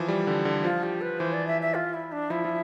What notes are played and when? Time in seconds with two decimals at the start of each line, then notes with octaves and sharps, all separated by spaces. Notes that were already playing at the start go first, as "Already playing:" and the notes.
Already playing: E3 F3
0.08 G3
0.27 D3
0.45 D3
0.64 F3 F4
0.83 G4
1.01 B4
1.19 E3 C5
1.33 D5
1.47 E5
1.62 E5
1.74 F4
1.94 E4
2.12 D4
2.30 F3 E4
2.45 F3